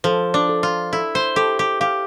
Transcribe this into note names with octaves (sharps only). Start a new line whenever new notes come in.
F3 A4
D4
A4
F4
E4 A4
C5
G4 A4
G4
G4 F5